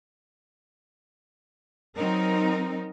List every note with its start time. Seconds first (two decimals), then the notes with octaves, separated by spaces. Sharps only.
1.96 F#3 C4 D#4 A#4